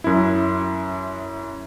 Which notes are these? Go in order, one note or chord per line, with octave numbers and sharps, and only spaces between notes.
F#2 E4